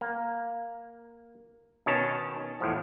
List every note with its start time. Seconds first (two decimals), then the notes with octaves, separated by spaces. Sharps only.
0.01 A#3
1.86 B2 D#3 C#4 C#5 A5
2.61 E2 A2 F3